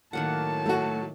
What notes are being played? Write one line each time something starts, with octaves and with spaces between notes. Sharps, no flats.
A2 D#3 F#3 A#3 F#5 A5
A3 F#4